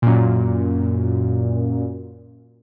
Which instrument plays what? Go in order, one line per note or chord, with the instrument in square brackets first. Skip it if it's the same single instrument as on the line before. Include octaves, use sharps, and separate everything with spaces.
[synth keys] F#2 A#2